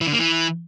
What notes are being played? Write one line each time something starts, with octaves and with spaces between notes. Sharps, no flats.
E3
D3
A#3
E3